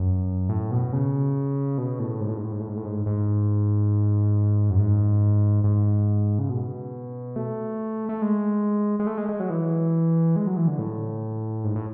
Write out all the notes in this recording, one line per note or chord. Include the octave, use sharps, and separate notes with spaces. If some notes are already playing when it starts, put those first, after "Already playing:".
Already playing: F#2
A2
B2
C#3
B2
A2
G#2
A2
G#2
A2
G#2
A2
G#2
A2
G#2
G#2
F#2
G#2
G#2
C#3
B2
A3
A3
G#3
G#3
A3
G#3
G#3
F#3
E3
G#3
F#3
E3
D3
A2
G#2
A2